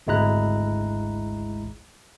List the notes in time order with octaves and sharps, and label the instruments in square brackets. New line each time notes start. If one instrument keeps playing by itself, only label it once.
[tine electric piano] G#1 D2 G#3 E4 A#5 F#6